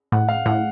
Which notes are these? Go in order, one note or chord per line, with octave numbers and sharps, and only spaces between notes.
A2 F#5
F5
A2 F#5